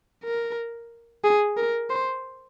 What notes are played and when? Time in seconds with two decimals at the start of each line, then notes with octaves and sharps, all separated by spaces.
0.24 A#4
1.24 G#4
1.57 A#4
1.90 C5